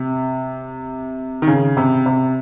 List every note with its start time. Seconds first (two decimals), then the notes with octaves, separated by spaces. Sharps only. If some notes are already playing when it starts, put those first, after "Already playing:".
Already playing: C3
1.42 D#3
1.48 C#3
1.77 C3
2.06 C3